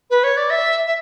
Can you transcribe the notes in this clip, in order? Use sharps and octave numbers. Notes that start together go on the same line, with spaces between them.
B4
C#5
D5
E5
E5